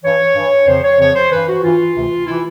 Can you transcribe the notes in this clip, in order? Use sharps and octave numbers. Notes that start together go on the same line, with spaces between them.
G2 E3 C#5
G2 E3
F2 C#3 F3 C5
C#5
F2 C#3 F3 C#5
C5
G2 E3 B4
F#4
G2 E3 F4
D2 C3 E3
C3 E3 E4